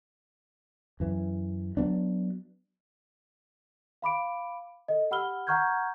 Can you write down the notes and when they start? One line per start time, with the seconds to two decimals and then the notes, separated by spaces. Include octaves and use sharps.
1.00 F#2 E3
1.77 F#3 B3 D4
4.02 F5 B5 D6 D7
4.88 A4 D#5
5.11 G4 F#5 B5 E6 F6 G7
5.47 F#5 A#5 C#6 F6 G6 G#6